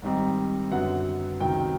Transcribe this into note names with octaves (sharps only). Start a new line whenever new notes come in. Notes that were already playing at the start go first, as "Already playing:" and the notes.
G#2 D#3 G3 C4 D#4
F#2 D3 F#3 B3 F#5
C#2 C3 D#3 F#3 G5